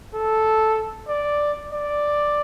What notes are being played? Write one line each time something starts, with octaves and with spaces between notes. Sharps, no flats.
A4
D5
D5